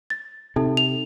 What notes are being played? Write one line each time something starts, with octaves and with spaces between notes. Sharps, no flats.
A6
C3 D#4 A4
F7